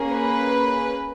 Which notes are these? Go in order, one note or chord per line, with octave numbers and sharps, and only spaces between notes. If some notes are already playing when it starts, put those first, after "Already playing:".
Already playing: A#3 C#4 G#4
B4